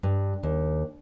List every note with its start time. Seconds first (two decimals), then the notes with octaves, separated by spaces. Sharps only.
0.03 G2
0.43 D#2